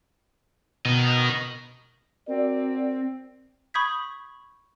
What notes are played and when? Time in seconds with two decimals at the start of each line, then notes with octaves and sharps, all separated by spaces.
0.86 B2 A#4 D#5
2.28 C4 F#4 A#4 D5
3.74 B5 C#6 D#6 G6 G#6 B6